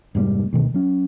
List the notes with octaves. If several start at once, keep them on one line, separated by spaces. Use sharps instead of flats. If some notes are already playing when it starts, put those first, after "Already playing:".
F1 G#2 G3 A#3
D2 B2 D#3
F#3 C#4